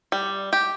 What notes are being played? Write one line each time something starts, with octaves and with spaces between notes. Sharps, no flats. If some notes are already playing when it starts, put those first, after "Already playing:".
G3
G4